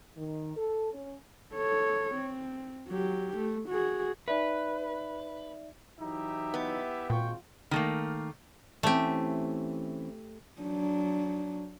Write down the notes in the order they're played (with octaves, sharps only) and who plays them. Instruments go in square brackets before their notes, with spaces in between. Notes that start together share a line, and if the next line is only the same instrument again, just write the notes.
[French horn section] D#3
A4
C#4
[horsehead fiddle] A4 C#5
C4
F#3 G4
A3
F#4 G#4
[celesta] D#4 D5 E5 [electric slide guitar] B4
[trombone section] E3 F#3 D#4 [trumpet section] E4 G4 E5
[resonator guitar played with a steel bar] B3
[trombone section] G#1 F4 [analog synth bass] A#2 [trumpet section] G5 C#6
[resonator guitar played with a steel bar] D#3 A3 A#3
[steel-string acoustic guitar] E3 C4 C#4 [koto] A3 G4
[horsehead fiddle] F#3 D4